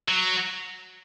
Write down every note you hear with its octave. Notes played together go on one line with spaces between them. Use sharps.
F#3